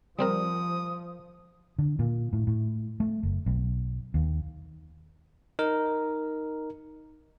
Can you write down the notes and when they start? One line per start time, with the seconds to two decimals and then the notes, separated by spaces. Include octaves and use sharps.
0.19 F3 G3 C4 A#4 D#6
1.79 D3
1.99 A#2
2.33 A2
2.47 A2
3.00 A3
3.23 F#1
3.46 B1
4.14 D#2
5.59 D#4 A#4